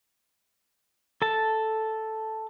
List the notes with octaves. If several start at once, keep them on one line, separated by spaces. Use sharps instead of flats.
A4 A5